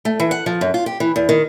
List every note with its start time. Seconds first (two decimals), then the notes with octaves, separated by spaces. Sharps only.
0.05 A3
0.20 E3
0.31 F#5
0.46 F3
0.61 F#2
0.74 F4
0.86 G4
1.00 E3
1.16 E2
1.29 D#3